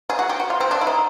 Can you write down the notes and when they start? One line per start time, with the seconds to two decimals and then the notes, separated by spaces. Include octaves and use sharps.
0.10 G#4
0.19 F#4
0.29 G4
0.40 F#4
0.50 F4
0.60 C4
0.71 D4
0.81 E4
0.87 D#4